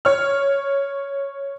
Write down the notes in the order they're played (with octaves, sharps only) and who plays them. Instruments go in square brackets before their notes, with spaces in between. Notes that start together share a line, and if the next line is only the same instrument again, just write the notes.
[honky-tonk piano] C#5 F6